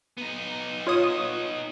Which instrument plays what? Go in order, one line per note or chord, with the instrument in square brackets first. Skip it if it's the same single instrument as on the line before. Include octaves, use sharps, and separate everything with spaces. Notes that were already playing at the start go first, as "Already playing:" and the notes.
[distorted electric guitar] B3 D#4
[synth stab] F4 C#5 D#6